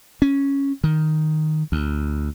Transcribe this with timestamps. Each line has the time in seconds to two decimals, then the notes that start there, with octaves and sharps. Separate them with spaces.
0.22 C#4
0.84 D#3
1.72 D2